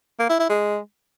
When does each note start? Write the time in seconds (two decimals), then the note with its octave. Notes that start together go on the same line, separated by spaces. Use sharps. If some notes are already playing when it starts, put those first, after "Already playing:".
0.19 A#3
0.29 E4
0.39 E4
0.49 G#3